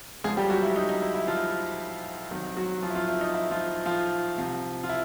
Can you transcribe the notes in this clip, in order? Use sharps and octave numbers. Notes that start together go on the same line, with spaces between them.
D2 C#3 F3 G#3 G#4
G3 G4
F#3 F#4
E4
D#4
D#4
E4
E4
F3 F4
C2 C3 D#3 F#3
F#3 F#4
F3 F4
E4
F3 F4
E4
D#4
E4
F3 F4
F3 F4
C2 C3 F3
F4
E4